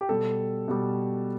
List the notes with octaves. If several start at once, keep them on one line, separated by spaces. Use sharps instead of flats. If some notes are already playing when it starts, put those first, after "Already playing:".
G4
B2 G3 A4
B2 G3